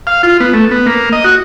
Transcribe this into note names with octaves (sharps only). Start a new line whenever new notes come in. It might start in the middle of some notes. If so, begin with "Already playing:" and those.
F5
F4
B3
A3
B3
A#3
D#5
F#4